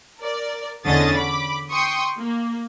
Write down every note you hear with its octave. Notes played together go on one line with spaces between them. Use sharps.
A#4 D5
E2 D3 C#4 D#5 D#6 A6
B5 D6
G5 C6 C#6 D#6
A#3